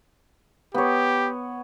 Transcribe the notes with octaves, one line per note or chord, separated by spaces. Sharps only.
B3 G4 C#5